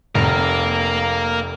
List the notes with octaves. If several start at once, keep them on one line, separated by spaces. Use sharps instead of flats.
F1 A#4 F5